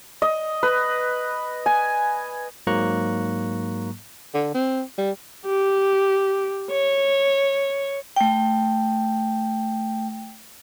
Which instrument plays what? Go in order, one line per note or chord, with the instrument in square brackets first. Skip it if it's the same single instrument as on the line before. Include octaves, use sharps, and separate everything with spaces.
[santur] D#5
B4
G#5
[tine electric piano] G#2 F#3 A#3 A#5 C#6 F#6
[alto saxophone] D3
C4
G3
[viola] G4
C#5
[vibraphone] A3 G5